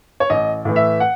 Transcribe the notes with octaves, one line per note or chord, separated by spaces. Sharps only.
C#5
A1 D#5
A2 E3
E5
F#5